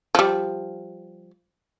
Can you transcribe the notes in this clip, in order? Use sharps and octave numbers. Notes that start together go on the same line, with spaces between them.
F3 G3